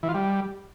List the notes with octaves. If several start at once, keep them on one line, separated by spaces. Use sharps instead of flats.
E3
F4
G3